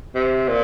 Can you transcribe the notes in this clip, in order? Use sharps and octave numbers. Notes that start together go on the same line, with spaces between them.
C3
A#2